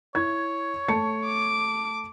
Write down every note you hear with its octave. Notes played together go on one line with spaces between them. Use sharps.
E4 C#5 G#6
A3 A5 C#7
D6